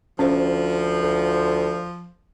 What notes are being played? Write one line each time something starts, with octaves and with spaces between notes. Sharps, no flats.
D2 F3 C#4 C5
D2